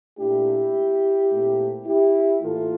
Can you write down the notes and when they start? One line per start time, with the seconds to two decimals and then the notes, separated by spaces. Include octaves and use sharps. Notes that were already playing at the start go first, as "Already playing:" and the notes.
0.18 A#2 A3 D4 E4 G4
1.30 A#2 A3 C4
1.86 E4 G4
2.42 A2 E3 A#3 F4 A4